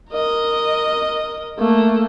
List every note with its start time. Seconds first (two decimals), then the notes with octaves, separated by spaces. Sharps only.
0.10 A#4 D#5
1.59 A3 A#3